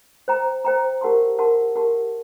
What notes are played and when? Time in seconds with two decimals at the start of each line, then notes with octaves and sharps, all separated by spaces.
0.28 C5 G5 A#5
0.65 C5 G5 A#5
1.01 G4 A#4 F#5 A5 C6
1.38 G4 A#4 F#5 A5 C6
1.76 G4 A#4 F#5 A5 C6